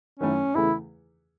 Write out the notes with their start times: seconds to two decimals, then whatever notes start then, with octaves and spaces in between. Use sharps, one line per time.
0.20 F#2 D#3 A3 C#4 E4 A4
0.55 E2 C#3 E3 A3 E4